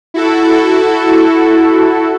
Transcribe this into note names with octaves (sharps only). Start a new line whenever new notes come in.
E4 F#4 A4